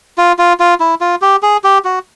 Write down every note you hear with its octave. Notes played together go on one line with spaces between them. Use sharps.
F4
F4
F4
E4
F4
G4
G#4
G4
F#4